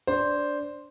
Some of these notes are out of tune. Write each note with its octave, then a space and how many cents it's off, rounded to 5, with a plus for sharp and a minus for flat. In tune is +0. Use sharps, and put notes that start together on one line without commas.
D4 -10 C5 +0